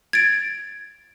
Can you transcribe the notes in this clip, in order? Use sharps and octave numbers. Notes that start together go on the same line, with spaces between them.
G#6 A6 D7